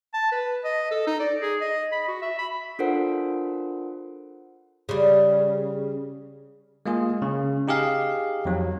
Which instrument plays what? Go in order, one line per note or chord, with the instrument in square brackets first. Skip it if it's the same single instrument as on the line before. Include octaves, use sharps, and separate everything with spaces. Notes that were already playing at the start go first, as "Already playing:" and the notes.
[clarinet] A5
B4
D#5
A4
D#4
D5
G#4
D#5
B5
F#4
E5
B5
[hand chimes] D4 F4 A4 A#4 C5 F#5
[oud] C#3 G3
[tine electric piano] G#3 A#3 F4 G#4
C#3
D#4 G4 G#4 F5
F2 F#3